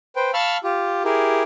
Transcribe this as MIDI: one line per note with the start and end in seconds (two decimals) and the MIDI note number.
0.16 0.31 71
0.16 0.31 72
0.16 0.31 79
0.34 0.57 77
0.34 0.57 81
0.34 0.57 83
0.34 0.57 85
0.34 0.57 88
0.34 0.57 89
0.64 1.03 65
0.64 1.03 67
1.04 1.43 64
1.04 1.43 67
1.04 1.43 68
1.04 1.43 70